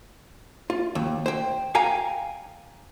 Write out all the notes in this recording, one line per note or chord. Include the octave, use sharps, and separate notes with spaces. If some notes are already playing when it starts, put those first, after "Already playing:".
F4
D#2
C5 G5
F5 G5 G#5 A#5